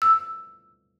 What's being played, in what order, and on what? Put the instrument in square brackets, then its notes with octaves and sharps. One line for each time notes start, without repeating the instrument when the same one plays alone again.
[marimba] E6